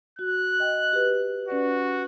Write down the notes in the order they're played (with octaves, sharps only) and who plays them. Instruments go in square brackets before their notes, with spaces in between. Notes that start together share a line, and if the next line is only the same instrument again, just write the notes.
[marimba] F#4 [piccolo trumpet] F#6
[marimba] D#5 G5
G4 B4
[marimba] C#4 B4 D5 [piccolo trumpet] F#4